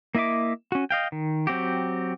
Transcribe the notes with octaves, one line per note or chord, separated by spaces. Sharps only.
A#3 E4 D#5 E5 D6
C#4 F#4
D#5 F5 G5
D#3
F#3 C4 F#4 G4